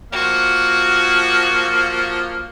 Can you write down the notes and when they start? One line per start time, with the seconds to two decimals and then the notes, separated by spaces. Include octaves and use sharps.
0.12 F3 A#3 F#4